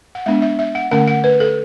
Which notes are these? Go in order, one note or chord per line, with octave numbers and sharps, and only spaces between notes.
F#5
G#3 B3 D4 E5
E5
E5
F#5
D3 A3 C#4 F#5
F#5
B4
A4